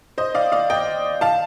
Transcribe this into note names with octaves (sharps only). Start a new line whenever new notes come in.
C5 D#5
D5 F5
D5 F5
D#5 G5
F5 A5